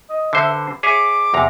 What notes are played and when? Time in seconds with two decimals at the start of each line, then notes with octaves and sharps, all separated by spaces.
0.10 D#5
0.33 D3 C5 E5
0.49 B4
0.83 G#4 C#5 E5 D6
1.34 E2 C3 A#5